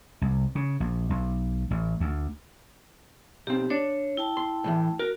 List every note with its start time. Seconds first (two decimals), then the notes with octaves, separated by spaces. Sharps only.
0.22 C2
0.55 C#3
0.80 A#1
1.10 B1
1.71 A1
2.00 D2
3.47 B1 C4 G4
3.70 D4 C#5
4.17 E4 G5 A5
4.37 C6
4.64 A2 C#3 E3
4.99 F#4 A#4